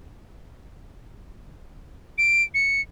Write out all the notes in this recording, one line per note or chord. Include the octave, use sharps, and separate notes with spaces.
D7
C#7